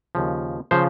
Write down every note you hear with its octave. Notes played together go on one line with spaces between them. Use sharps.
D#2 C#3 F3
C#3 F3 C5